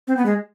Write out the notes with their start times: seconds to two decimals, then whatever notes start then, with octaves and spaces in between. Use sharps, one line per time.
0.08 C4
0.17 B3
0.26 G#3